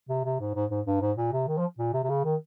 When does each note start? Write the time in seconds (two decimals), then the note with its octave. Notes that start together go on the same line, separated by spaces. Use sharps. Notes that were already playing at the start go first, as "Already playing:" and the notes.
0.09 C3
0.24 C3
0.40 G#2
0.55 G#2
0.70 G#2
0.86 G2
1.01 G#2
1.17 A#2
1.32 C3
1.47 D#3
1.58 F3
1.78 A#2
1.93 C3
2.04 C3
2.09 C#3
2.24 D#3